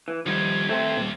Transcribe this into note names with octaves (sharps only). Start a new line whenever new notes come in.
E3
D#2 D#3 F3 G3 D#4 G#6
A3 C4 C5 E5
A#2 G3